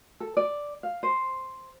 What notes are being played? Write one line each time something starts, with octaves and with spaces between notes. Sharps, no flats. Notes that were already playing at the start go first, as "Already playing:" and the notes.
A4
D5
F5
C5